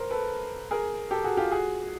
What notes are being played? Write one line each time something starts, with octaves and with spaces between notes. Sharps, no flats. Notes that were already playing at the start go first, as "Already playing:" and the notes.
Already playing: A#4 C5
A4 B4
G#4 A#4
G4 A4
F#4 G#4
F4 G4
F#4 G#4